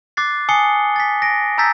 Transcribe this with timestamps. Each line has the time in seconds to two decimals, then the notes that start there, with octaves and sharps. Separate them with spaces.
0.17 D6 F#6 A6 C7
0.49 G#5 A5 D#6 C7 C#7 G7
0.96 A6 B6
1.22 A#6 D7
1.58 A5 A#5 E6 G6 A6 B6